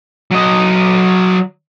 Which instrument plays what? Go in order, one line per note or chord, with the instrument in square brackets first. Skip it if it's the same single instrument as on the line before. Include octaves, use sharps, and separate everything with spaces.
[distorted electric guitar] F#3 D#5